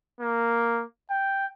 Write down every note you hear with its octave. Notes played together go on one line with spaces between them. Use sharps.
A#3
G5